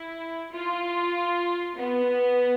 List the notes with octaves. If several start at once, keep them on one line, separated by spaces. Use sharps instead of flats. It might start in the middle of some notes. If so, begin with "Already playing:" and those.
Already playing: E4
F4
B3